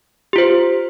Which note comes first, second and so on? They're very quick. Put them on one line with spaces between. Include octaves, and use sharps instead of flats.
G4 F4 C5